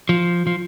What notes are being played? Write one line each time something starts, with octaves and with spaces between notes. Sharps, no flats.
F3
F3